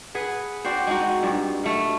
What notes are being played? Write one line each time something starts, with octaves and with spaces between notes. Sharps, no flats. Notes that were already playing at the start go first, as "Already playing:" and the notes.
G#4 B4 F#5
C4 D4 F#4 C5
G#3 D#4 F#4
G2 A#2
B2 A3